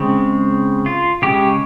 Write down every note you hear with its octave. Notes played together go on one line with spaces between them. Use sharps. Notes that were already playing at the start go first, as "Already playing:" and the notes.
Already playing: C#3 G#3 C4
F4
C#3 G#3 C#4 G4